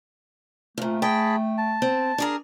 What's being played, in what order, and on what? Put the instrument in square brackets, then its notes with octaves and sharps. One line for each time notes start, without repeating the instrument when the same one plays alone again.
[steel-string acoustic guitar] F2 A#2 [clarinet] A3
[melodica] G#4 A5 B5 [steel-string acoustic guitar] G5
[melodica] A5
[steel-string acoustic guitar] C4
D4 G#4 A#4